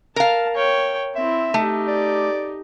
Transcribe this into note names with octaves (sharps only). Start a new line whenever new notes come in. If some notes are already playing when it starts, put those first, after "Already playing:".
A#4 F5 A5
C#5 G5
C4 E4 E5
A3 D#4 G4
D5